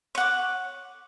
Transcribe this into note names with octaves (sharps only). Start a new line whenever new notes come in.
C#5 F#5 D6